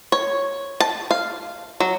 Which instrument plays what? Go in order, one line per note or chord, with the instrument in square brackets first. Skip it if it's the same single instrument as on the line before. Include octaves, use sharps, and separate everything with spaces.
[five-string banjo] C#5
A5
F5
F#3